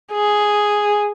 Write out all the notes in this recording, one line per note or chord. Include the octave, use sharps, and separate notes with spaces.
G#4